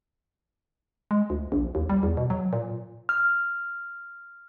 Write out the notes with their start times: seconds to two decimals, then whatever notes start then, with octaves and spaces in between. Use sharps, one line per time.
1.11 G#3
1.30 D2
1.52 A#1
1.75 D#2
1.90 G3
2.03 E2
2.17 B2
2.30 F#3
2.53 A#2
3.09 F6